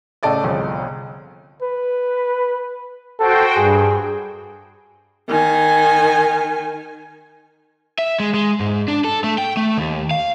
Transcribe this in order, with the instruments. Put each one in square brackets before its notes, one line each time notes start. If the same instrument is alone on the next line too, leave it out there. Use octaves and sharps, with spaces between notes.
[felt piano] A2 C#3 A4 D5 D#5
G1 C2 F3 G#4 D#5
[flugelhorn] B4
[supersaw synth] F#4 C5 G5 [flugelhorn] A4
[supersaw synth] G2 [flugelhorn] G#4
[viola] D#3 G#5
[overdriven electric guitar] E5
G#3
G#3
G#2
D4
A4
A3
G5
A3
D#2
F5